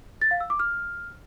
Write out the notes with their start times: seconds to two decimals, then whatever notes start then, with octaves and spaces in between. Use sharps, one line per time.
0.22 A6
0.31 F5
0.40 E6
0.50 D6
0.59 F6